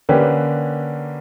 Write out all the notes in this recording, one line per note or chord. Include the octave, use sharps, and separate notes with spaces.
D3 A#3 C#4 G4 B4